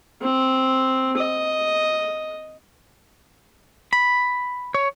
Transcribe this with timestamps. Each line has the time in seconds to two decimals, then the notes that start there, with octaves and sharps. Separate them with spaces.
0.22 C4
1.17 D#5
3.93 B5
4.74 C#5